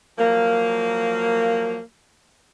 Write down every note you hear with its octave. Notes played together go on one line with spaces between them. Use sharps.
F3 F#3 A#3